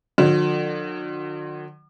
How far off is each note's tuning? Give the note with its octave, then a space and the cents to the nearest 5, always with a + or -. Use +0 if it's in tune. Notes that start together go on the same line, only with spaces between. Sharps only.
D3 +40 F#3 -45